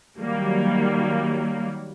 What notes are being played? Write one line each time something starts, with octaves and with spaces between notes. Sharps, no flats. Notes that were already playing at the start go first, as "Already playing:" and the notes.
D#3 F#3 G3 A#3